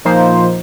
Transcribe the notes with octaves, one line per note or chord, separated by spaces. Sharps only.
A#2 F3 A#3 D#4 C5